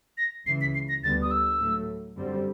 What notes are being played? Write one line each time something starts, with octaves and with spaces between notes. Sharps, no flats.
A#6
C#2 C#3 E3 C7
B6
C7
A#6
D2 D3 G3 B3 A6
D#6
E6
A2 F#3 A3
F#2 D3 G3 C4